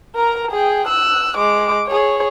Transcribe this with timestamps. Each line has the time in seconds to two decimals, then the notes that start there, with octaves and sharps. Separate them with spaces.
0.16 A#4 A#5
0.51 G#4 G5
0.87 E6 F#6
1.37 G#3 D6
1.87 G#4 C#5